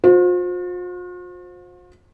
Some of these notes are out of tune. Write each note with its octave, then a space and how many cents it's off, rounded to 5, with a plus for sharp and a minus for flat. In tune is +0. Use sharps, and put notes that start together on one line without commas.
F4 +45 C5 +5